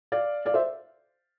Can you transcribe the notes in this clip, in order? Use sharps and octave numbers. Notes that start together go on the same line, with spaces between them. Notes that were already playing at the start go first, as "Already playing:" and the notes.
D5 F5
D5 F5
C5 E5